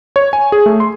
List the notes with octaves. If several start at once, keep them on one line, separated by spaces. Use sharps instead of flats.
C#5
G#5
G#4
A3
C6